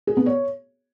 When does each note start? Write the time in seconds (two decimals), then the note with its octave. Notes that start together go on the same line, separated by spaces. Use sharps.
0.07 G#4
0.17 B3
0.26 C#5